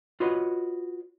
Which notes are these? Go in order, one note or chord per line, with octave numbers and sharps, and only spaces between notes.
F4 F#4 B4 C#5 D#5